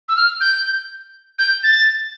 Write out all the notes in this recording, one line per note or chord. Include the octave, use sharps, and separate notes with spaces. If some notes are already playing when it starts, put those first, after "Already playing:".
E6
F6
G6
G6
A6